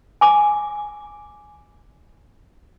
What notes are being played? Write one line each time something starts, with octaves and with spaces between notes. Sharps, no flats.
G#5 D6